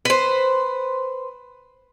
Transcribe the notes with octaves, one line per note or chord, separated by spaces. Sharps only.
B4 C5